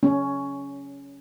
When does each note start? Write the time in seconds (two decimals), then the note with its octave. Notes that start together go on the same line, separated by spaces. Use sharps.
0.03 C#4